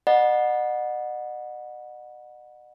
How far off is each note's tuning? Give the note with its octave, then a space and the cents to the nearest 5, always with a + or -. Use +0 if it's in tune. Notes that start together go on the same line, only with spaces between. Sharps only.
D#5 -40 F#5 -20 B5 -40